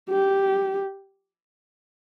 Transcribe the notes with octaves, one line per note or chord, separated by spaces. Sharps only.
G4